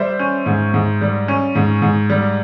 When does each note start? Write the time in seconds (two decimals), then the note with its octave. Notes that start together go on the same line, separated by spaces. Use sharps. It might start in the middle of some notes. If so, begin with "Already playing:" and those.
Already playing: G3 C5 E5
0.19 C#4
0.46 G#2
0.74 G#2
1.01 G3
1.28 C#4
1.55 G#2
1.82 G#2
2.10 G3